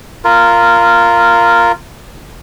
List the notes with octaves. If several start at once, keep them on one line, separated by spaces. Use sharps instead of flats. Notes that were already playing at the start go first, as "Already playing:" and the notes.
F4 A#4